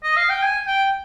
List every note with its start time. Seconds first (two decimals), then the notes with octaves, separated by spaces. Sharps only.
0.03 D#5
0.17 F5
0.29 G5
0.43 G#5
0.67 G5